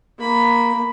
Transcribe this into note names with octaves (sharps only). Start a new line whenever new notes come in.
A#3 B5